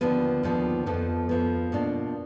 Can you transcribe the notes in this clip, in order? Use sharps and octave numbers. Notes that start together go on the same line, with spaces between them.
D#2 D3 F3 B3
D#2 D3 F3 B3
F2 F3 B3
F2 F3 B3
B2 A#3 D4 F4